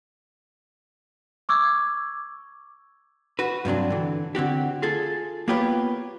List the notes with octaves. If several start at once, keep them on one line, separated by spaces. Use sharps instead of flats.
C#6 D6 E6 G#6
F#4 B4
G2 C3 F#3 D4
D3 E3
D3 C4 F#4 G4
F4 G#4 A4
A#3 B3 F4 G4 B4 C#5